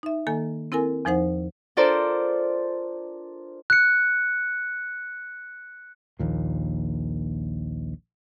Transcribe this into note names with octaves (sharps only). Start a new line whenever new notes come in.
D#4 E5
D#3 A#3 A4 G#5
C4 E4 A4 A#4 G#5
E2 F3 D#4 C5 F#5
D4 F4 A4 A#4 C5 D5
F#6 C#7
A#1 D#2 A#2